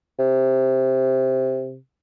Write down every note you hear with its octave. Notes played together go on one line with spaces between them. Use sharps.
C3